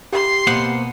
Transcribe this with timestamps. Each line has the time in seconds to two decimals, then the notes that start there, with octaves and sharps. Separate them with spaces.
0.13 G4 C6
0.47 B2 A#3 B3 C5 F#5